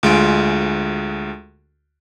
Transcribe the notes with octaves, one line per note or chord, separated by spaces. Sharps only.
D2 G#3 F4 D7